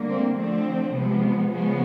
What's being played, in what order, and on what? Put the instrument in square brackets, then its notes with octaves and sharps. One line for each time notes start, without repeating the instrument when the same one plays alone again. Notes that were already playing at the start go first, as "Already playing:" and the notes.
Already playing: [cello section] D3 G3 A#3
C4
D3 F3 A3 C4
C3 F3 G#3 B3
C#3 F3 G#3 B3